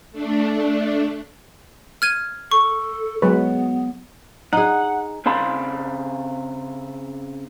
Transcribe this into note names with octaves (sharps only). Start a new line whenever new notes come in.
A3 D4
F6 G#6 D#7
A4 C#6
F#3 G#3 B3 B4
D#4 G#4 F#5
C#3 C4 F5 B5 C6